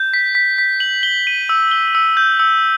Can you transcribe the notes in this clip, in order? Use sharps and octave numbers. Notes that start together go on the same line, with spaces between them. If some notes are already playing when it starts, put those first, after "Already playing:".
Already playing: G6
B6
B6
B6
F#7
G7
D#7
E6
G7
E6
G6
E6